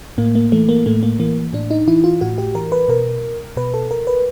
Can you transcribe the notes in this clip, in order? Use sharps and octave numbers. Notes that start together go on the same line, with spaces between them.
A2 A#3
A#3
E3 A3
A#3
A2 A3
A#3
E3 A#3
A2 D4
D#4
E3 E4
F4
A2 F#4
G4
E3 A#4
B4
B2 A#4
B2 B4
A4
A#4
B4